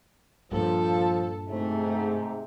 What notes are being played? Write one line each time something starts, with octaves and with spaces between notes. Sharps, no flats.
G2 A#2 F3 A4
G#2 C3 A3